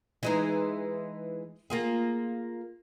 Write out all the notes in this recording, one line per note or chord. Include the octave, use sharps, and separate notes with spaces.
E3 G#3 D#4
A#3 F4 G#4